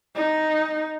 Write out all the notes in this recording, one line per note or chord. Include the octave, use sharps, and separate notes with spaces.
D#4